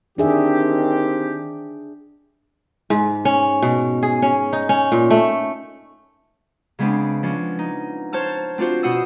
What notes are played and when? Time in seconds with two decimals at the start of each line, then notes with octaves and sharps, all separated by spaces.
0.18 D#3 C4 D4 G4 G#4 E5
2.90 G#2
3.25 C#4
3.62 B2
4.03 G#4
4.22 C#4
4.53 D#4
4.69 C#4
4.92 A#2
5.10 A3
6.79 C#3 G#3 B3 C4 D4
7.23 F3 C#4 D4
7.59 D#4
8.13 C5 C#5 A5 F6
8.58 C4 D4 F4 F#4 C5
8.83 B2 F#4 C5 F#5 D#6 E6